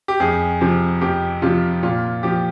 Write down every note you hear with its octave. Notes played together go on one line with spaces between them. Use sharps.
G4
F2 G#4
C3 F3
F2 G4
C3 F3 F4
A#2 F4
F3 G4